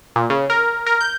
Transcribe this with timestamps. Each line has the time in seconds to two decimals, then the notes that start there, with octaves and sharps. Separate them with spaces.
0.16 A#2
0.30 C#3
0.50 A#4
0.86 A#4
1.01 G6